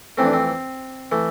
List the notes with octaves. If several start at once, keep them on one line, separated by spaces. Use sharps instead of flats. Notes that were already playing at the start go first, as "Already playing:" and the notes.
F2 E3 A3 C4
D4
C4
E3 A3